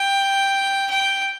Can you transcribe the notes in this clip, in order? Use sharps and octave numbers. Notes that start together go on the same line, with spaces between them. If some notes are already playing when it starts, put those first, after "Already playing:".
Already playing: G5
G5